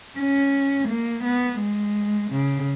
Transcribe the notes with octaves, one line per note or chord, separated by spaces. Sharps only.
C#4
A#3
B3
G#3
C#3